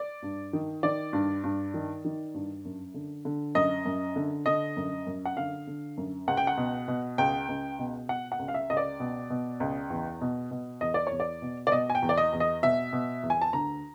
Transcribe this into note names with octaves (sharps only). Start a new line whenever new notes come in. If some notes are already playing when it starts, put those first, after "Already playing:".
Already playing: D5
G2
D#3
D#3 D5
G2
G2
D#3
D#3
G2
F#2
D3
D3
F#2 D#5
F#2
D3
D3 D#5
F#2
F#2
F#5
D3 F5
D3
F#2
C#2 F#5
G5
F#5
B2
B2
C#2 G5
C#2
B2
B2 F#5
F#5
C#2
F5
E5
C#2 D#5
D5
B2
B2
C#2
E2
B2
B2
E2 D#5
D5
E2 C#5
D5
B2
D5
B2 D#5
G#5
G5
E2
D5
D#5
E2
D#5
B2 E5
B2
E2
G#5
A5
D2 A#5